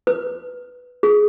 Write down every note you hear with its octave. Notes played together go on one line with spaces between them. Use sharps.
B4
G#4